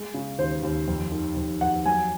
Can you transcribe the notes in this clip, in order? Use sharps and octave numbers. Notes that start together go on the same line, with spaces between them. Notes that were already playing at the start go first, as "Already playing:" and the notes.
Already playing: G#3
C#3
D#2 C5
D#2
F2
D#3
F2
F2 F#5
F#3 G#5